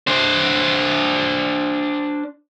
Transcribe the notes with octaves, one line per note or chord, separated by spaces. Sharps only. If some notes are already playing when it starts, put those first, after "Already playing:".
D4 C5